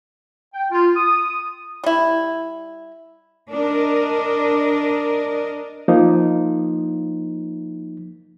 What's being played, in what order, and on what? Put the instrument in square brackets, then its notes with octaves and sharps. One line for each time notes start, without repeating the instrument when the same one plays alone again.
[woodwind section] G5
F4
D#6
[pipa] G3 E4
[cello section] D4 A#4 D#5
[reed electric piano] F3 A#3 D#4